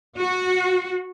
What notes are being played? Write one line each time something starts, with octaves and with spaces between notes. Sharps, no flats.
F#4